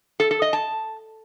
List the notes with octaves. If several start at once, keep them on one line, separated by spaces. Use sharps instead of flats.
A4
A4
D#5
A5